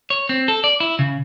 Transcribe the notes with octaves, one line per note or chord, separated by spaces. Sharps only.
C#5
C4
A4
D5
E4
C#3